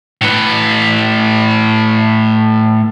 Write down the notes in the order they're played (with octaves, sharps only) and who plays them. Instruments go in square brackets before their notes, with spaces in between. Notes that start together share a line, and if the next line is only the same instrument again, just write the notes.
[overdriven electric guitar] A2 B4